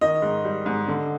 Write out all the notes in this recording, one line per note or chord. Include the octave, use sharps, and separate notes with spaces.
D#3 D#5
G#2
G3
G#2
D3